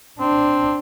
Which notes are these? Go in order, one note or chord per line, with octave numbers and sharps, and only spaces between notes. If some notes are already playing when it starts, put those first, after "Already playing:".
C4 D4